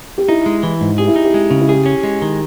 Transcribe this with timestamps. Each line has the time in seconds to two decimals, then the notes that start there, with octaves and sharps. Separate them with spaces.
0.18 G4
0.28 D#4 E4
0.46 G#3
0.63 E3
0.81 G#2
0.98 G4 G#4
1.08 E4
1.16 D#4
1.25 G4
1.34 G#3
1.51 C#3
1.60 E4
1.69 G4 G#4
1.86 C#4
2.03 G#3
2.22 D#3